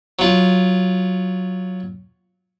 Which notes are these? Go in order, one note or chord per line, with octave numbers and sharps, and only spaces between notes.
F#3 F4